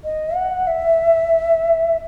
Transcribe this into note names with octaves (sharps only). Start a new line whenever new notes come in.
D#5
F#5
E5